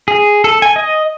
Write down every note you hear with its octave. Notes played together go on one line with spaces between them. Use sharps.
G#4
A4
G#5
D#5